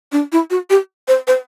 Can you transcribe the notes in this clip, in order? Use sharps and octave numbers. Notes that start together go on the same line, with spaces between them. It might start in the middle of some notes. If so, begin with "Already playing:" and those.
D4
E4
F#4
G4
C5
C5